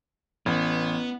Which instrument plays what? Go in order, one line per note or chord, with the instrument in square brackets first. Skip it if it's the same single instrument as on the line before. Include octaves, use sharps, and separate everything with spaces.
[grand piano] A1 [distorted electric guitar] B3